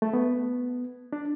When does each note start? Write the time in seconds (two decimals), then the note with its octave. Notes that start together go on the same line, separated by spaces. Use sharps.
0.02 A3
0.13 B3
1.13 D4